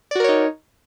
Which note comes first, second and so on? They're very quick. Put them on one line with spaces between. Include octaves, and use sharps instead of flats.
D5 F#4 A#4 C#5 D#4